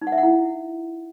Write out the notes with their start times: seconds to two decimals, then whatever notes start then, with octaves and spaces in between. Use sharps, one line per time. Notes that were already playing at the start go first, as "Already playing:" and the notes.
0.02 D#4
0.07 F#5
0.12 E5
0.18 F#5
0.23 E4